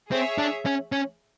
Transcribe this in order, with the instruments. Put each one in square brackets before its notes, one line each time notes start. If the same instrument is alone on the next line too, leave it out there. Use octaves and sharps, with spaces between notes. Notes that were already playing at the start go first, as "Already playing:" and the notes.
[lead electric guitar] C4 [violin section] G#4 C#5 E5
[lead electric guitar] D4
C#4
C#4